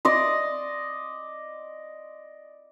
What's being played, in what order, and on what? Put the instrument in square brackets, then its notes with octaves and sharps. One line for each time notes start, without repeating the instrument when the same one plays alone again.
[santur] D5 D#5 C6